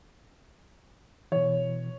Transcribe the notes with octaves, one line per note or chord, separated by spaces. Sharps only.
B2 E3 C#5